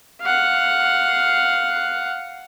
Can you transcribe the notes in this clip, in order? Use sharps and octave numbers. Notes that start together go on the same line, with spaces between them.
F5 F#5